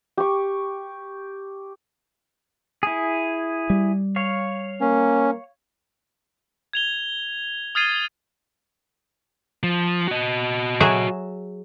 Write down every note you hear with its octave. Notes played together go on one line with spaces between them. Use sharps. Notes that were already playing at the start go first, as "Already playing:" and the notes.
G4 C#6
E4 G#4
G3
C#5 F5
A#3 C#4
G#6 F7 G7
D#6 F6 G#6 A6 C7 D#7
F3
F#4 D#5
F#3 G#4 E5